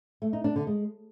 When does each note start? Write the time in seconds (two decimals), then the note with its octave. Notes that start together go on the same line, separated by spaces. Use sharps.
0.22 A3
0.33 D#4
0.44 D4
0.56 D3
0.67 G#3